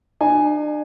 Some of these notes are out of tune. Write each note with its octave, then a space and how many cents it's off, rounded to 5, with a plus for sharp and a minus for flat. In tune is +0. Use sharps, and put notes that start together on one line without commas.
D4 +40 G#5 +0